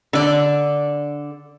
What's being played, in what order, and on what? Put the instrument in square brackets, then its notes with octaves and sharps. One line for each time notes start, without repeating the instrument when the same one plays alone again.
[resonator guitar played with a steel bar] D3 D5